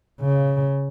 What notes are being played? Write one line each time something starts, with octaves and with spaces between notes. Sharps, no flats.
C#3